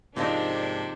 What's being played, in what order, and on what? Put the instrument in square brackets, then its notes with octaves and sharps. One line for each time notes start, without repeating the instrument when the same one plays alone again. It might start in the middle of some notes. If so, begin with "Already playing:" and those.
[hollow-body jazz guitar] G#2 A#3 D#5 [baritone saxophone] C3 [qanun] F3 D#4 [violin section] D4